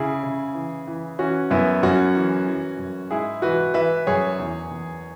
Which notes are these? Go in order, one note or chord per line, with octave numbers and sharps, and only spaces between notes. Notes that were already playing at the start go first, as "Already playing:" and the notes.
Already playing: C#3 E4 G#4
C#3
E3
E3
E3 C#4 F#4
F#2 B3 E4
F#2 C#4 F#4
E3
E3
F#2
G#2 E4 G#4
E3 F#4 B4
E3 B4 E5
F#2 G#4 C#5
E2
E2